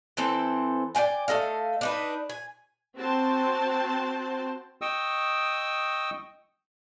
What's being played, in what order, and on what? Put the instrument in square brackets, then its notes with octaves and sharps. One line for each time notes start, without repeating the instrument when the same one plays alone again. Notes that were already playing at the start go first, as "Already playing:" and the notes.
[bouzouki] E3 C4 A4 C5
D5 F5 G5 G#5
A3 A4 D#5 F5
D4 D#4 B4
G#5
[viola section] C4 F#4 C5 A5
[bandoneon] D#5 G5 C#6 D#6 E6